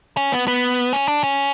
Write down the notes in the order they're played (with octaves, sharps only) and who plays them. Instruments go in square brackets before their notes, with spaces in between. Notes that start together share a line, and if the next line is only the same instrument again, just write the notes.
[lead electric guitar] C#4
B3
B3
C#4
D4
C#4